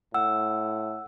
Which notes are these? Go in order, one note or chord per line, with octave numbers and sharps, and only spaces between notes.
A2 F#5 E6